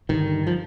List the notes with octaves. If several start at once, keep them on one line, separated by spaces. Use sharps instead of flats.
G2 D3 D#3
F3